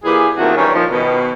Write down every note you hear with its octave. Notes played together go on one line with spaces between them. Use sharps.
A#2 E3 G4 G#4
F#2 A#2 D#3 A3 C4 F#4
G2 D#3 E3 C#4
A#2 F3 D#4
B2 D#3